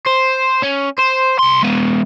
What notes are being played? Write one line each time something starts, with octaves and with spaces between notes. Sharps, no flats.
C5
C#4
C5
C2 C6
G#3 B3